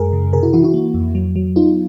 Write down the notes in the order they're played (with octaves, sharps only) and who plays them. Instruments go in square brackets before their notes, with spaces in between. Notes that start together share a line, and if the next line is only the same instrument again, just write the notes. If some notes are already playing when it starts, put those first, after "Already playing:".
Already playing: [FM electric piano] F#2 G#3 G#4 A#4
C#3
C3 G#4 A#4
E4 F#4
E3 E4 F#4
E4 F#4
A#3
F2
F#3
F#3
B3 D#4 F4